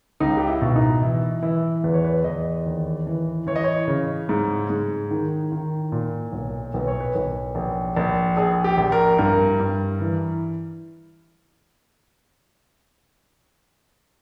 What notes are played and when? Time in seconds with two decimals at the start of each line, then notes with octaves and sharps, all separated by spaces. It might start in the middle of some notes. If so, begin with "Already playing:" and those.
0.20 C#2 D#4
0.37 G4
0.47 E4
0.62 B2
0.76 D#4
1.02 E3 E4
1.42 E3 E4
1.84 E2 B4
1.94 C#5
2.04 B4
2.24 E2 D#5
2.66 D#2
3.07 E3
3.47 E3 C#5
3.56 D#5
3.64 C#5
3.88 C#3
4.29 G#2
4.70 G#2
5.11 D#3
5.52 D#3
5.92 A#2
6.32 B1
6.74 B1 B4
6.88 C#5
7.00 B4
7.15 B1
7.55 A#1
7.96 A#1
8.37 A#1 G#4
8.64 G4
8.78 A#1
8.92 A#4
9.18 G2 A#4
9.60 G2
10.00 E3